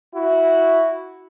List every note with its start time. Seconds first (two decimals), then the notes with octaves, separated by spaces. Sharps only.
0.15 E4 F#4